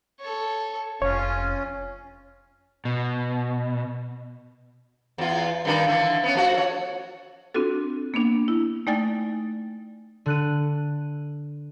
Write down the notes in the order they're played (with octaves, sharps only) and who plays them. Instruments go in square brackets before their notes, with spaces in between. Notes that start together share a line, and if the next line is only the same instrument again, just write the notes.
[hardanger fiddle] A4 C#5
[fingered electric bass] F1 [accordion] C#4 [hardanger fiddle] F4 [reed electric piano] C#5
[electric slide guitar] B2
[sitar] E2 F4
G2 D#3 D4
D3 E3 E5
B3 C#4
F3 A3 F#4
A4 C#5
[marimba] C4 D4 F4 F#4 A4
A#3 B3 D4
E4
A3 D#4 D5 G5 G#5 A6
[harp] D3 F#6 D#7